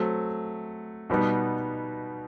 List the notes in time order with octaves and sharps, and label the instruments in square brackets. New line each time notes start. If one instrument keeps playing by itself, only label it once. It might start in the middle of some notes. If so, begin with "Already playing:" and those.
Already playing: [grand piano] F#3 A3 C4
B2 G3 B3 D#4